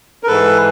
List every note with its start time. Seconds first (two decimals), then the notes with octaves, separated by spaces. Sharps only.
0.23 A#4
0.27 G#2 E3 A4 B4